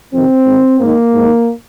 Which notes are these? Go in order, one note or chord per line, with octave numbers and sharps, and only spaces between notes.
F2 C3 D#3 C4
G#2 D#3
G#2 D#3 A#3
G#2 D#3